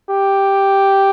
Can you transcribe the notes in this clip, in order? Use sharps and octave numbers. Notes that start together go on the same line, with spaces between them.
G4